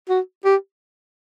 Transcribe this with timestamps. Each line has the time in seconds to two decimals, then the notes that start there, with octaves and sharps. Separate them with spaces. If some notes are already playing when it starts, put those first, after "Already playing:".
0.09 F#4
0.45 G4